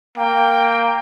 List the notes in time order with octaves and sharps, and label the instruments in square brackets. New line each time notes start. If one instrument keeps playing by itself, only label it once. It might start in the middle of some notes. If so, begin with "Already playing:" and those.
[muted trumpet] A#3 [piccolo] G5